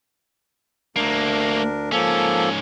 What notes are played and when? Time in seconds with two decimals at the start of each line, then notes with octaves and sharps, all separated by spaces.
0.96 D2 A3 A#3 D4 A#4
1.92 G#2 F3 A#3 C#4 A4